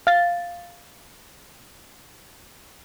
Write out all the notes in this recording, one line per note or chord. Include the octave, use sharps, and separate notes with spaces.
F5 A6